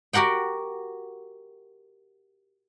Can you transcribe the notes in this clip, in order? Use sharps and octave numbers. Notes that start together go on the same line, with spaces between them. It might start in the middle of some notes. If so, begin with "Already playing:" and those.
F#4 G4 A#4 F#5 G5